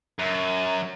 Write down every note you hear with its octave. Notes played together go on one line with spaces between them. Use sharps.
F#2